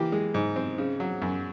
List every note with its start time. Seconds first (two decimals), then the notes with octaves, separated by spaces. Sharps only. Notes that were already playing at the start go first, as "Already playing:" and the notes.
Already playing: E3 A#3 G4
0.12 G#3
0.34 G#2
0.56 C4
0.78 C#3
1.00 F#3
1.22 F#2